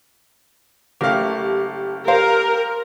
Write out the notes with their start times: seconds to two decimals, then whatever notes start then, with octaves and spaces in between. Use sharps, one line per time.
1.01 F#1 A3 G4 A#4 F5
2.08 A#4 C5 F5